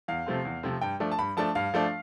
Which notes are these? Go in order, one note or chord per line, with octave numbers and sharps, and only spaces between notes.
E2 F5
C3 F3 A3 C4
E2
C3 F3 A3 C4
G2 G5
F3 A3 D4
A5
G2 B5
F3 A3 D4 A5
G2 F5
F3 A3 D4